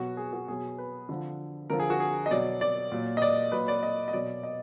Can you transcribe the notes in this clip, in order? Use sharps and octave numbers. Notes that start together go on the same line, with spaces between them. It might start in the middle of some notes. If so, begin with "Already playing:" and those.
Already playing: B2 F#3 F#4
G#4
F#4
B2 F#3 G#4
B4
D3 F3
D3 F3 A#4
G#4
F#4
G#4
D#5
B2 F#3 D5
D5
A#2 F#3
D#5
D5
A#2 F#3 B4
D5
D#5
D#5
B2 F#3 D5
D#5